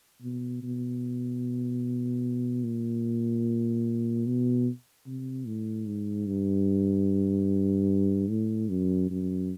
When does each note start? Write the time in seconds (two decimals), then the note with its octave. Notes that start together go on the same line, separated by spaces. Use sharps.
0.21 B2
0.62 B2
2.63 A#2
4.26 B2
5.06 C3
5.46 A2
5.87 G#2
6.27 G2
8.29 A2
8.69 F#2
9.10 F#2